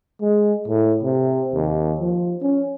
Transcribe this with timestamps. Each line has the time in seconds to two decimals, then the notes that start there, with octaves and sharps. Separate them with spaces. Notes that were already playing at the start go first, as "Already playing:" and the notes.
0.21 G#3
0.68 A2
1.03 C3
1.55 D#2
2.00 F3
2.42 C#4